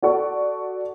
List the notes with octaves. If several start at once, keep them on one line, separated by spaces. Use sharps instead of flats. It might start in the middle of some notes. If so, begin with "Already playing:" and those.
F#4 A4 D5 F#5 C#6